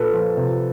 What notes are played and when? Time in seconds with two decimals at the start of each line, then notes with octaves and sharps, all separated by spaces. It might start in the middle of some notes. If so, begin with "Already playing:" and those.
Already playing: A#2 A4 B4
0.13 F3
0.37 C3